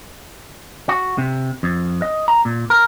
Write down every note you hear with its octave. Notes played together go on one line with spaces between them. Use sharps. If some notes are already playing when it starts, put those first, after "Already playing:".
F#4
C3
F2
D#5
A#5
A#2
A#4